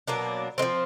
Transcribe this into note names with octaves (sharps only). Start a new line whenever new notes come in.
B2 F#3 A#3 D4
F3 G#3 C4